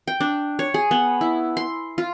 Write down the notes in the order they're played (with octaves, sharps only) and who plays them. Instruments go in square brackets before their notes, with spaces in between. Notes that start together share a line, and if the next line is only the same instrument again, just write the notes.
[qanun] G5
D4
C#5
G#4
B3
E4
C6
F4